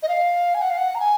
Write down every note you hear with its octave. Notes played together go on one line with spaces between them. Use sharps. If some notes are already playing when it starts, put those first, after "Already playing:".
D#5
F5
G#5
F#5
F5
F#5
A#5
G#5